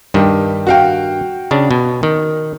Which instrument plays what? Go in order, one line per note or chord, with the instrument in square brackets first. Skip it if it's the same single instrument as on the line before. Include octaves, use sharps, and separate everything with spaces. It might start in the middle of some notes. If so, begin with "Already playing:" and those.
[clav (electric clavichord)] G2 D#3 [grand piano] G3 G4
[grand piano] F#4 F5 G5
[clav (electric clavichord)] C#3 D4
B2
D#3